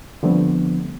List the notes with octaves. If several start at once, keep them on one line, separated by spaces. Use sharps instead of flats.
D3 F3 G3 A3 B3 C4